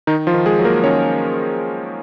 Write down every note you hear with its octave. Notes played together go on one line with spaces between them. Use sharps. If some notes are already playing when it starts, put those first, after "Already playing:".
D#3 D#4
F3 F4
D#3
G#3 G#4
F#3
A#3 A#4
D#3 C#4 C#5